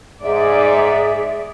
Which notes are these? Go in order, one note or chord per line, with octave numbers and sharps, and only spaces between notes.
G#2 G#4 D5 E5